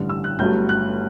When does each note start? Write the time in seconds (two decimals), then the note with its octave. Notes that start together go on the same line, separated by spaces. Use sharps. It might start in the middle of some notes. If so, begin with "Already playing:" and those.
Already playing: A1 G2 D3 G3
0.09 E6
0.24 F#6
0.39 G1 G2 F#3 A3 G6
0.69 F#6